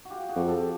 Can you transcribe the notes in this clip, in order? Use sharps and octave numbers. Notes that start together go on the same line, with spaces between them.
F#4
F4 G4
F#4 G#4
F2
G4 A4